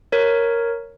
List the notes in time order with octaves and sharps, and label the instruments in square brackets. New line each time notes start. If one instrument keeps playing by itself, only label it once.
[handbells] A#4 C#5